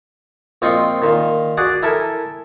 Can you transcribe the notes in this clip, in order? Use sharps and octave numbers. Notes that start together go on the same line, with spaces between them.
A#1 C4 F4 D#5 C#6
A#2 D#3
F#4 G#4 D5
E4 A4 A#4 G#5